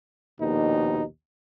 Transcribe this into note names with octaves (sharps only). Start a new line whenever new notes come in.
A#1 D#2 B2 D#4